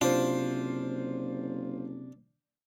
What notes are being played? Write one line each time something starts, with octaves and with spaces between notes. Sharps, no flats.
F#1 C3 D4 F4 C5